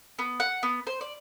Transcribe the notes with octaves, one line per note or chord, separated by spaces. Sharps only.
B3
F#5
B3
C5
D5